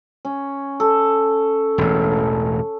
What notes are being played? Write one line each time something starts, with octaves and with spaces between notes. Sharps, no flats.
C#4
A4
E1 A1